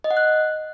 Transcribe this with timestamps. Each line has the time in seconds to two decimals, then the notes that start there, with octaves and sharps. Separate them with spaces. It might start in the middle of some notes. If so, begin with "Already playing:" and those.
0.04 D#5
0.11 F#5
0.17 F#6